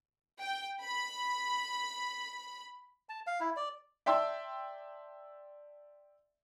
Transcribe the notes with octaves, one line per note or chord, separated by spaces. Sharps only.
G5
B5
A5
F5
E4
D5
D5 E5 G5 A5 C6 E6